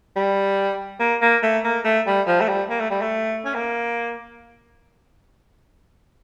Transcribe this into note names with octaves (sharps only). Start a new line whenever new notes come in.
G3
A#3
A#3
A3
A#3
A3
G3
F3
A3
G3
A#3
A3
G3
A3
C#4
A#3